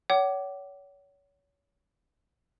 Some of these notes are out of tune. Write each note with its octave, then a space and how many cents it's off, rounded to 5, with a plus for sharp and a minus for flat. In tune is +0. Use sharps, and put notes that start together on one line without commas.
C#5 +30 F#5 +40 D6 +0